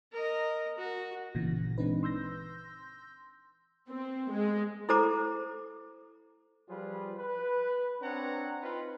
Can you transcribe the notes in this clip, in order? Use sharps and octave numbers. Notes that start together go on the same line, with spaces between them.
A#4 D#5
F#4
G#1 A#2 C#3 E3 A#6
E3 G#3 C4 D4 D#4 B4
C6 E6 G6 A#6
C4
G#3
E4 A4 C5 A#5 D6
F3 G3 F4 G#4 B4
B4
C4 D4 C#5 F#5 A#5
C4 D#4 F4 B4